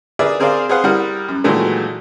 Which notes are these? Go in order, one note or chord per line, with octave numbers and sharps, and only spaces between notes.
G#4 A#4 B4 D5 E5
C4 G#4 A#4 C5 D5 F5
G#4 B4 C5 F5 F#5
G3 E4 A#4 F#5 D#6 F6
F#2
A#2 D#3 E3 F#3 G#3 A3